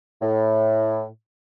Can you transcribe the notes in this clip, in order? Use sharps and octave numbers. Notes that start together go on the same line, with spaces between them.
A2